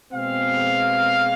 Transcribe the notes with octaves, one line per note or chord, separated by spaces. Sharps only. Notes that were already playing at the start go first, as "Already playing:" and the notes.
B2 G#3 C4 F5